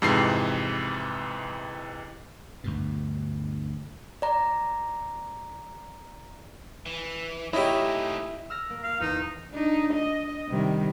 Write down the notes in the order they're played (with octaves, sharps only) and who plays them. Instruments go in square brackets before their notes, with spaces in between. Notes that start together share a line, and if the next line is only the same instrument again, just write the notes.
[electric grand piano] F2 G#2 C3 E3 C7
[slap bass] D2 G2 B2
[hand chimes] D5 A#5
[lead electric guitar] E3
[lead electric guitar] A3 D#4 [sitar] E4 [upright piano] G4 C#5 D#5
[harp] E6 F6 A#6
A#3
[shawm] F5
[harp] E2 [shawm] D#4
[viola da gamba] D4 D#4
D#5
C3 D#3 G3